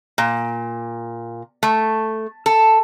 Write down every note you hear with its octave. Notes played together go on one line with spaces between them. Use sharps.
A#2
A3
A4